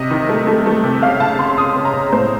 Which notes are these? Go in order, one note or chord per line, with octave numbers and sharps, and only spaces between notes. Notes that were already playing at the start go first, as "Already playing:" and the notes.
Already playing: C3 D#5
D#3
A3
A3
A3
C3
C#3 F5
C#3 A5
C#3 C6
C#3 D#6
C#3
A#5
C#3
A2 C5